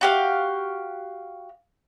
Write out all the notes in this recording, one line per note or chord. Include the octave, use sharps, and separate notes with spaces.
F#4 G4 F5